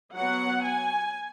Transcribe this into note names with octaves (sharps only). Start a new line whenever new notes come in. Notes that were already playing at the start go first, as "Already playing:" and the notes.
F#3 B3 F#5
G#5